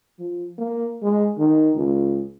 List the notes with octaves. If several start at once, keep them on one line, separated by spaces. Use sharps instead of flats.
F3
A#3
G#3
D#3
C#2